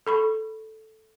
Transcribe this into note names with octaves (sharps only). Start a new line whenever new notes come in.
A4 B5 C#6